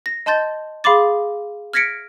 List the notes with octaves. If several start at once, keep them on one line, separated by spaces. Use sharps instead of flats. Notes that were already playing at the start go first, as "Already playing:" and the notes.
A#6
D#5 A5 C6 G6 A6
G#4 F5 B5 C6 D6 A6
F6 G#6 A#6 B6 C#7 D7